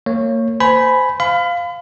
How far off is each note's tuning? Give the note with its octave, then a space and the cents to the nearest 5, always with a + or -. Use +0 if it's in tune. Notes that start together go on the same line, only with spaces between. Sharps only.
A#3 -30 C#5 -10
C5 -25 G#5 +15 B5 +0
F5 +0 B5 +35